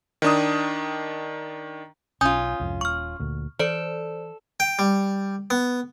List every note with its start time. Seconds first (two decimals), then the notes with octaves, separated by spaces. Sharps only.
0.22 D#3 D4 D#6
2.21 B1 C#4 F4 G#5 D#6 G6
2.60 C2 F2 G#2
2.81 D#1 C#6 F6
3.20 D2 A#2
3.59 E3 A4 C5 D5 D7
4.60 G5
4.79 G3
5.50 B3